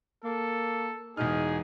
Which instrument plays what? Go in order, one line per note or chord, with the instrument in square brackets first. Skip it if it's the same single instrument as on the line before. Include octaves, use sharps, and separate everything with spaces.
[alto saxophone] A#3 [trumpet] A4
[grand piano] E1 B2 F6 [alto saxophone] D#4 [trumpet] G#4